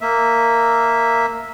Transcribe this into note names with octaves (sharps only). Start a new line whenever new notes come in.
A#3 E5